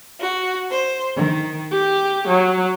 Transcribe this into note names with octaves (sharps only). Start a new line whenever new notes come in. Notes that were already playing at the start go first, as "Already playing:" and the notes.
F#4
C5
D#3
G4
F#3